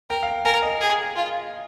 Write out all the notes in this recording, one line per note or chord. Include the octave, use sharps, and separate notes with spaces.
A#4 G5
F5
G5
A#4 G#5
D#5
G#4
F4